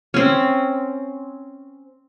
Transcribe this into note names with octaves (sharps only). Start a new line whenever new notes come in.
C4 C#4